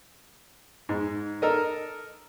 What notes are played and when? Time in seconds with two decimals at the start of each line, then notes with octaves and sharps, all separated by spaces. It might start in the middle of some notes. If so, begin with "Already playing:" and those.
0.89 G#2
1.42 A4 A#4 D#5